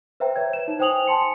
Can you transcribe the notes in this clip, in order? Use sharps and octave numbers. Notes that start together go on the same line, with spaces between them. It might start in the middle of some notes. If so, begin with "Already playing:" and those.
B4 C5 E5 G5 A#5
B4 C#5 G#6
E7
D#4
C5 G5 G#5 D#6 F7 F#7
G#5 A5 C6 C#7